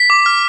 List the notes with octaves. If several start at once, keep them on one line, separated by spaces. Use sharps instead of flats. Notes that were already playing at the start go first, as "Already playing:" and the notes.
Already playing: B6
D6
F6